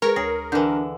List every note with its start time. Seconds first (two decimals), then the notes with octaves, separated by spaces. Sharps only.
0.02 G#3 G#4 A#4 B4 C#5
0.16 D2 G#4 C#5 A#6
0.52 D3 E3 D4 G6